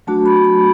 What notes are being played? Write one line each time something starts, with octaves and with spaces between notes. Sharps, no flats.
F#3 A3 D4 F#4 A5
B5
B5